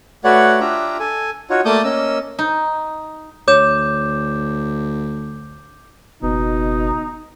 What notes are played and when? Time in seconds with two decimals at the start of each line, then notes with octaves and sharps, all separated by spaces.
0.24 A3 F#4 B4 C#5 D5 F#5
0.60 D4 F4 G4 E5 A#5
1.00 A4 G#5
1.50 D#4 F4 F#4 C#5
1.65 A3 A#3 D5 A5 D#6 G6
1.84 A#3 C#4 D#5 E6
2.39 D#4
3.48 D2 C#5 D6 G6 E7
6.23 F#1 B2 D#4